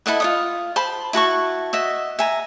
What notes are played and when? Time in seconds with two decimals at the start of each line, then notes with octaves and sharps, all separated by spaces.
0.06 E4 A4 D#5 F#5
0.20 F4 C#5 D#6
0.76 C5 A5 B5
1.13 E4 F#4 A5 C#6
1.73 F#4 D#5 E5
2.19 E5 G#5 A#5